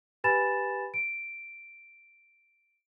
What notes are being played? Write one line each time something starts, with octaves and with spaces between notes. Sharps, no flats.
G4 B4 G#5 B5 A6 E7
D7